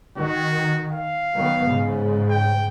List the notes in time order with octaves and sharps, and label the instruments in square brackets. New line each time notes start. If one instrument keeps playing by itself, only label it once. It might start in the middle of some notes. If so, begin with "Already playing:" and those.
[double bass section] D#3 [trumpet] F#4
[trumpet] F5
[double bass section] D#3 F#3 B3
G#2 C#3
[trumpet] G5